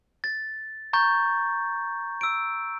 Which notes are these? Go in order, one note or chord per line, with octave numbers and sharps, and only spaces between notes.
A6
A#5 C#6 G6 A6
E6 D7